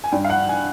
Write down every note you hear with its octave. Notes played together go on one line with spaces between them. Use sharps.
G#5
G2 G5
F5
F#5
G#5